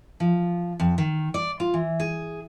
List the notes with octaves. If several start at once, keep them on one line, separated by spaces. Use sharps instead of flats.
F3
F2
D#3
D5
F4
E3
G#4